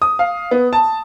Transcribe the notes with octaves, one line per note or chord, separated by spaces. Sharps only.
D#6
F5
B3
A5